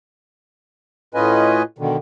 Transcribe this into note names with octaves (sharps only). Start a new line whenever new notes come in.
A2 C#4 F4 B4 D#5 G#5
B2 D3 D#3